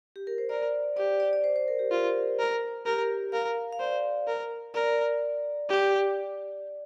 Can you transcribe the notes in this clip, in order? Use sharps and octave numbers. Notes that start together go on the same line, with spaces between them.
G4
A#4
C5
A#4 D5
G4 D5
D5
D5
C5
C5
A#4
G4
F4 A#4
A#4
G4 A#4
A#4 F5
F5
C5 D5
A#4
A#4 D5
G4